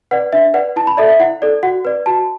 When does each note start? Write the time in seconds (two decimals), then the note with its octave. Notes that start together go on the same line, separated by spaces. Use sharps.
0.11 B4 D5 F#5
0.33 D4 E5
0.54 B4 D5 F#5
0.76 E4 A5
0.87 B5
0.97 A4 D5 E5
1.08 E5
1.20 E4 F#5
1.42 A4 D5
1.63 F#4 F#5
1.85 B4 D5
2.06 F#4 A5